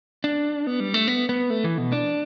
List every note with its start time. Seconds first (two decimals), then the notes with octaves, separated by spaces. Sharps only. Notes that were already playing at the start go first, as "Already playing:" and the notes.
0.24 D4
0.67 B3
0.80 G3
0.94 A3
1.08 B3
1.29 B3
1.50 A3
1.64 E3
1.78 B2
1.92 D4